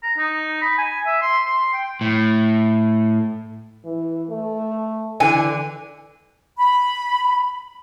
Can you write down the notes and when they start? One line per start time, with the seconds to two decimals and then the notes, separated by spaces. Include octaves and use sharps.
0.03 A#5
0.18 D#4
0.62 B5
0.78 G#5
1.06 E5
1.22 C6
1.46 C6
1.74 G5
2.01 A2
3.85 E3
4.29 A3
5.20 D3 E3 G#5
6.57 B5